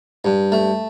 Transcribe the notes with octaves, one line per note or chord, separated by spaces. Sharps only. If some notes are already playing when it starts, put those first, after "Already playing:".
G2
A3